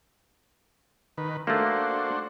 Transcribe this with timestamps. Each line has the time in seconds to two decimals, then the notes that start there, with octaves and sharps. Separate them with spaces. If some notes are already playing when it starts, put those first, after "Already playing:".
1.18 D#3 B4
1.47 A3 A#3 D4 F#4 C5